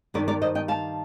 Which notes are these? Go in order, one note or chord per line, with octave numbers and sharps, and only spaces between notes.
G2 D#3 G3 A#4 D5
A#4 D5
C5 D#5
D#5 G5
F5 A5